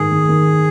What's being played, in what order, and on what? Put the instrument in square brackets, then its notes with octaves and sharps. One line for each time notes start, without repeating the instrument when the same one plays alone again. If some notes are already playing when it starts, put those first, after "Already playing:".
Already playing: [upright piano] G#2 D#3 [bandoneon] G#4
[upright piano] D#3
D#3